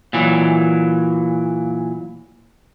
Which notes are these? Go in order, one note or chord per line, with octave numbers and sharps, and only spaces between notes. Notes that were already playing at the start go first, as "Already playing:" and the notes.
A#2 E3 F#3